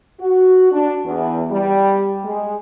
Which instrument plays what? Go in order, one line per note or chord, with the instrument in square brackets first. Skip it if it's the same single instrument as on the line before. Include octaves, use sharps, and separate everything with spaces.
[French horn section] F#4
D4
E2
G3
G#3